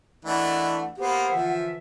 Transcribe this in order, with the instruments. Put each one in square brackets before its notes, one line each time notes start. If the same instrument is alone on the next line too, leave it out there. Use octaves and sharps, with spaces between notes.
[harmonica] E3 A3 D4 [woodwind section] A#4 D#5 E5 [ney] F#5
[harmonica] A#3 B3 [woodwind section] G4 C5 [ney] F#5
[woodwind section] D3 E3 E5 [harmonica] F3